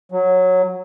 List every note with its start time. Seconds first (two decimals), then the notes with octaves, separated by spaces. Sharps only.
0.12 F#3